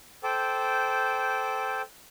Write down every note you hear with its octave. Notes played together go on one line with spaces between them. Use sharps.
A4 C5 G5 D6